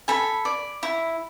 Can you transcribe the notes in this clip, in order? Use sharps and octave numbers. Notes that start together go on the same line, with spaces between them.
A4 G#5 B5
D5
E4